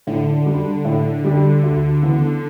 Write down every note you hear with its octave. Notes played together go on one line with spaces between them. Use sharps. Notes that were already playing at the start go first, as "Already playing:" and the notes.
A2 D3
G3 D4 G4
A2
G3 D4 G4
D2
C#3 E3 B3